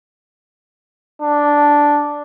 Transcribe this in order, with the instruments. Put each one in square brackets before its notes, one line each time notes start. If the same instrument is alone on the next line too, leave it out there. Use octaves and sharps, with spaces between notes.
[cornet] D4